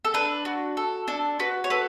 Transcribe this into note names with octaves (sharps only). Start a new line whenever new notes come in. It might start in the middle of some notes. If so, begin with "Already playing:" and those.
A4
D4 B4
F#4
A4
D4 A4
F#4 B4
C#5
A4 B4